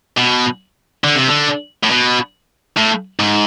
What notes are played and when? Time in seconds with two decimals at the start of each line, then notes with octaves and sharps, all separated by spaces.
0.18 B2
1.04 D3
1.16 C3
1.28 D3
1.83 A2
1.91 B2
2.77 A2
3.20 G#2